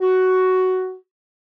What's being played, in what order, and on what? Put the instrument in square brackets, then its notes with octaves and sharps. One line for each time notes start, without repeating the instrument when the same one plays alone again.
[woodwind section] F#4